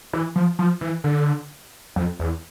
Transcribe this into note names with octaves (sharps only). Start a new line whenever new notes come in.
E3
F3
F3
E3
D3
F2
E2